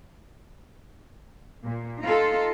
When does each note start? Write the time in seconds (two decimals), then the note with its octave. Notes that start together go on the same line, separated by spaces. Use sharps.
1.65 A#2
2.02 D#4 F4 A4